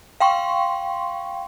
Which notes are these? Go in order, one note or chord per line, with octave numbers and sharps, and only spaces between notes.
F5 G5 C6 C#6